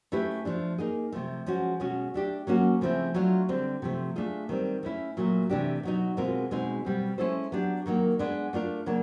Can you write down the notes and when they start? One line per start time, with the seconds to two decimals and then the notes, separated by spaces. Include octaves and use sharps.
0.12 A3 C#4 E4 G4 B4
0.45 F3 A3 D4
0.78 A#3 D#4 G#4
1.12 C3 F3 A3
1.46 F3 G#3 C#4 F#4
1.80 B2 G#3 C#4 F#4
2.14 A3 D4 G4
2.47 F#3 A#3 C#4 F#4
2.81 C#3 F3 A3 C4 E4
3.14 F#3 A3 D4 F4
3.49 D3 G3 C4
3.82 C3 F3 A3
4.16 A3 D4 F4 G#4
4.49 D#3 G3 C4
4.83 A3 C#4 E4
5.17 A#2 F#3 A3
5.49 C3 E3 A3 D4 G4
5.83 B2 F#3 B3 D#4
6.17 B2 G#3 C4 F4 A#4
6.51 B2 G#3 C4 D#4
6.85 B2 G3 C4
7.18 G#3 C#4 E4 A4 C5
7.52 F#3 B3 D4 G4
7.86 D#3 F#3 A#3 D#4
8.19 G#3 B3 D4
8.53 A3 D4 F4 A#4
8.86 C#3 F#3 A#3 D4